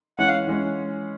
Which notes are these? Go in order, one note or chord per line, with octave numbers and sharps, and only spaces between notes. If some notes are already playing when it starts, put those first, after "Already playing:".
E3 G#3 C#4 F#5
F5
E3 G#3 C#4